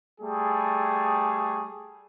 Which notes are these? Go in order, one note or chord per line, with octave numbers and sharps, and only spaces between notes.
G3 A3 G#4